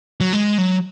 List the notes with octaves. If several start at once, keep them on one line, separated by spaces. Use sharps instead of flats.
F#3
G#3
F#3